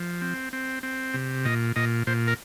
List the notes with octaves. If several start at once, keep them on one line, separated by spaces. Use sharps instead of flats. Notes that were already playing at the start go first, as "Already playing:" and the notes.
Already playing: F3
C4
C4
C4
C3
A#2 D#5
A#2 D#5
A#2 C5
A#4